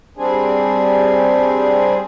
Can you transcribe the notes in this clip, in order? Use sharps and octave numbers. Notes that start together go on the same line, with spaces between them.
G3 C4 D4 G#4